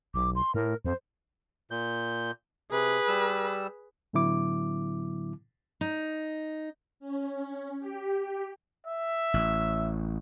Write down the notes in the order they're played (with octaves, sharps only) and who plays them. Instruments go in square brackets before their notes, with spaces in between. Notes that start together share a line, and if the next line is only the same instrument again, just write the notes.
[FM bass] B1 [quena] D6
[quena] C6
[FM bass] A2 [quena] A#4
[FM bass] F2 [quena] C5
[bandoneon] A#2 G6
[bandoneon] C3 [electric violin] G#4 B4
[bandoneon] G3 E6
[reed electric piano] A2 D3 F#3 B3 E4 D6
[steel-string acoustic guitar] D#4
[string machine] C#4
G4
[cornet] E5
[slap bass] A1